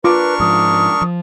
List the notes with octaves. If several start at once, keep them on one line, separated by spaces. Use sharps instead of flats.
D4 F4 A#4 B4 C#6 D6
G#2 F3 D#6
F3